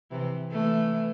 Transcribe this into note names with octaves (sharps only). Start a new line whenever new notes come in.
C3 E3
E3 A3